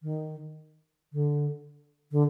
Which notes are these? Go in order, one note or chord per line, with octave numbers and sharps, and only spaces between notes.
D#3
D3
D3